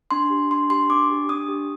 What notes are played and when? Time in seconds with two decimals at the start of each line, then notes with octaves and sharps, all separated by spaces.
0.11 D4 C6
0.30 G4
0.51 D4 C6
0.70 G4 C6
0.90 D4 D6
1.10 G4
1.29 D4 D#6
1.48 G4